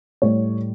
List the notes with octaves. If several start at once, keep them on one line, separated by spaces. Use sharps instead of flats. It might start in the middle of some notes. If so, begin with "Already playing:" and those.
A2 G3 C#5